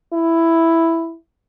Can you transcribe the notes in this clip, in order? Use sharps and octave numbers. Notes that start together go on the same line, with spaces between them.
E4